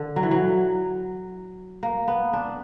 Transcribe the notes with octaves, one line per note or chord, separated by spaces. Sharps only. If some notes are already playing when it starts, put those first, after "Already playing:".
Already playing: D3
F#3
E3
F#3
A#3
B3
D4